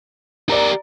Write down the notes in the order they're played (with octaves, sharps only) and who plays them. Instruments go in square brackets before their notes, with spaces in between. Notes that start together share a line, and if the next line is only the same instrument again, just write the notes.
[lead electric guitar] G4 A#4 [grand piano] D5 A#5